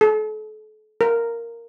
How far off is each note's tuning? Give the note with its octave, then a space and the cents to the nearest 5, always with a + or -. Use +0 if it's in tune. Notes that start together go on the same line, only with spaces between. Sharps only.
A4 -40
A#4 -5